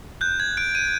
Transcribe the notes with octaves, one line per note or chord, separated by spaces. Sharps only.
F#6 G6
G#6
F#6 D7
D#7